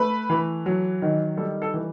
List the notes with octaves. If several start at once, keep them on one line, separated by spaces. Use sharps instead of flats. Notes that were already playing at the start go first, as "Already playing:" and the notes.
Already playing: A3 B4
E3
F#3
D#3
G3 A4
A4
E3